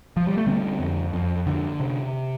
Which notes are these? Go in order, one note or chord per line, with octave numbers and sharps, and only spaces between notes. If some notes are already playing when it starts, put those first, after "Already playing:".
F3
G3
A3
D3 G3 C4
F2
F2
D3
C3